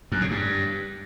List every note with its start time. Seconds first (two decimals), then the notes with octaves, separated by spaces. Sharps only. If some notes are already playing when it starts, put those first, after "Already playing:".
0.12 F#2
0.21 C#3
0.31 G2